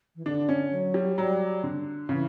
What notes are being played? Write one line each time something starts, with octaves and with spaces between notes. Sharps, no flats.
E3
D3 D4
C#4
F#3
G3
F#3 G3
D3
C#3 E3